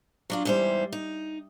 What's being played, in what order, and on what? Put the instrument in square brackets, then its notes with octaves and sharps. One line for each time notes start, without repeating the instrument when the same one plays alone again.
[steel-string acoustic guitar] F#3 D4 F4
E2 G#2 G3 E4 C5
D#4